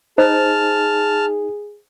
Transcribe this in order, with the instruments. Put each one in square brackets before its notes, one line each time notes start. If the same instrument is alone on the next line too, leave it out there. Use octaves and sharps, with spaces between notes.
[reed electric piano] D#4 [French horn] G#4 [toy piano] C5 [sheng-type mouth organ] A5 F6